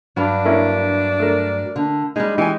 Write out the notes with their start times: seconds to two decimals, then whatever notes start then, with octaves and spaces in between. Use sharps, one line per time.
0.17 G2 F#3 D4
0.45 A#3 C#4 E4
1.19 A3 A#4
1.76 D3
2.16 G3 G#3 D#4
2.38 E3 G#3 D#4 G4 G#5